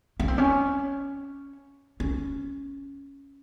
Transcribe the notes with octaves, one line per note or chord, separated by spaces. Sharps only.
C#4
C4
C#4
C#4